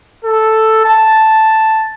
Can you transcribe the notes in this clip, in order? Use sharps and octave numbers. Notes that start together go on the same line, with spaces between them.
A4
A5